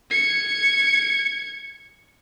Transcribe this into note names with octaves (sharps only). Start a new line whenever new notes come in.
G#6 C#7